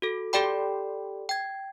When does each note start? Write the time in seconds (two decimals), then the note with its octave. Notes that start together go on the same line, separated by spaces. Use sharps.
0.02 F#4 A4
0.33 G4 A4 D5 G5 B5
1.29 G5 G#6